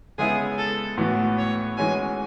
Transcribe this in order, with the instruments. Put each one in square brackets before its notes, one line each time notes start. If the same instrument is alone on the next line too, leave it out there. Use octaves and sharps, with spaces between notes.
[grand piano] C#3 G#3 B3 E4 [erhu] G#4
[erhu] A4
[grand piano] A2 E3 B3 F#4
[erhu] C#5
[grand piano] E3 G#3 C#4 F#4 [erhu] G#5